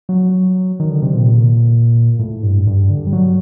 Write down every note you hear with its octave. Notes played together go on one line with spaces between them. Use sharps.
F#3
D#3
D3
C3
A#2
A2
G2
G2
D3
G3
F#3